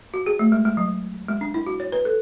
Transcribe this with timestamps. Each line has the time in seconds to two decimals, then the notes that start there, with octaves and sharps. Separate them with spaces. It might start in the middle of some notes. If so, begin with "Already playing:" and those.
0.14 F#4
0.26 G#4
0.39 A3
0.52 G#3
0.65 G#3
0.77 F#3
1.29 G#3
1.41 D4
1.54 E4
1.67 F#4
1.80 C#5
1.92 B4
2.05 A4